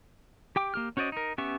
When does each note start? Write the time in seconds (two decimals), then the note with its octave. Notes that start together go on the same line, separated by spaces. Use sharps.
0.56 G4 G5 D6
0.74 A#3 G4 F6
0.97 C#4 F#4 C5 D5 D#5
1.12 D#4 A#4
1.38 B3 C#4 G4 E5 C#6